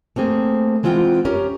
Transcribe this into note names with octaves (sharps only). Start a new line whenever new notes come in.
A3 A#3 C4 G#4
E3 G#3 C4 F4 F#5 G5
C#4 G4 A#4